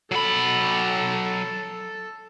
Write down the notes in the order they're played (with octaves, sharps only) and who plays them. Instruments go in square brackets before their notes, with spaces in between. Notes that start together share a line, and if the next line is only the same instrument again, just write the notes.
[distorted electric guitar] F#3 B5 [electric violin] A4